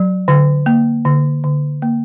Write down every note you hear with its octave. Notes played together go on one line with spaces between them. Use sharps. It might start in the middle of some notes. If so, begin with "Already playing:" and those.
Already playing: F#3
D3
A#3
D3
D3
A#3